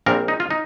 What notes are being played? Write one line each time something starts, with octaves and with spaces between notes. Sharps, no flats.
A#1 A#2 G3 C4 A#4
D#4
F4
D#4